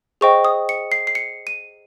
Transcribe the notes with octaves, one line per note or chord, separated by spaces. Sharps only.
G#4 C5 D#5 G5 C#6
D#6
C#7
C7
C7
C#7
D#7